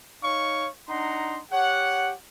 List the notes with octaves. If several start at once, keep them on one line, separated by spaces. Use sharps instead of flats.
D#4 C#5 F5 C#6
D4 D#4 F#5 A#5 C6
G4 C#5 F#5